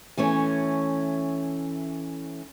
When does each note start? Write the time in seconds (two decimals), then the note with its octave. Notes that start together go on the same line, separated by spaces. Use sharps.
0.17 E3 A3 C#4 C#5